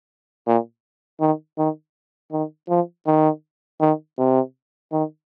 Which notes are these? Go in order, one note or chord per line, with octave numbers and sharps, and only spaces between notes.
A#2
D#3
D#3
D#3
F3
D#3
D#3
C3
D#3